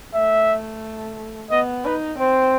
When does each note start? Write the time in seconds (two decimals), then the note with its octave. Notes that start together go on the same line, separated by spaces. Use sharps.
0.15 A3 E5
1.51 B3 D#5
1.85 D#4 B4
2.19 C4 C5